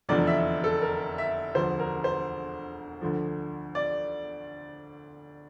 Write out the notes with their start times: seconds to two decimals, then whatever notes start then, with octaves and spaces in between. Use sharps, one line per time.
0.09 F1 E2 D3 F3 D5
0.27 E5
0.64 A4
0.82 A#4
1.18 E5
1.55 E1 D2 D3 F3 C5
1.79 A#4
2.04 C5
3.01 D2 D3 F3
3.75 D5